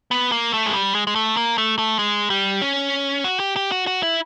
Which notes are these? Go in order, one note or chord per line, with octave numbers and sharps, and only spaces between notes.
B3
A#3
A3
G#3
G3
G#3
G#3
A3
A#3
A3
A3
G#3
G3
C#4
F#4
G4
G4
F#4
F#4
E4